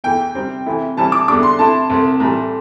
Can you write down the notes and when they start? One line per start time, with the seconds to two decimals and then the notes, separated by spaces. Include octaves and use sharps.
0.04 E2 E3 A3 G5
0.35 C3 G3 C4
0.66 C3 E3 A3 E4
0.97 C3 E3 G3 C4 E4 A5
1.12 D6
1.28 E2 D3 G3 D4 D6
1.43 C6
1.59 C3 A3 E4 A5
1.90 C2 C3 A3
2.20 A2 E3 G3